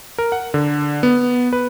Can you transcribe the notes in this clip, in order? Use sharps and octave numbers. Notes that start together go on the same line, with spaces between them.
A#4
F#5
D3
B3
B4